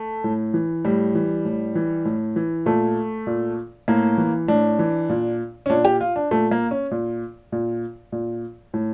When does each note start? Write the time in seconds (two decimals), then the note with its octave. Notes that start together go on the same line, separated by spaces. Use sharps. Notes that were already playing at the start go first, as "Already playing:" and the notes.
Already playing: A3
0.24 A2
0.54 E3
0.85 A2 G3
1.15 E3
1.45 A2
1.75 E3
2.05 A2
2.36 E3
2.66 A#2 A3
3.27 A#2
3.88 A2 A#3
4.18 E3
4.48 A2 D4
4.79 E3
5.09 A#2
5.66 C#4
5.70 A#2 D4
5.85 G4
6.01 F4
6.16 D4
6.31 A#2 A3
6.51 A#3
6.71 C#4
6.91 A#2
7.52 A#2
8.12 A#2
8.74 A2